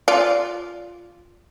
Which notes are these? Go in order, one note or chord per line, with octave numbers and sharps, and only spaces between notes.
F4 D5